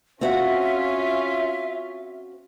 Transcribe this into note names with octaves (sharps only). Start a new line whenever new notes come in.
C4 C#4 F4 F#4 E5 F5